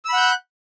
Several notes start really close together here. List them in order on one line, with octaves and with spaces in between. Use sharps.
E6 B5 F#5 G6 F#6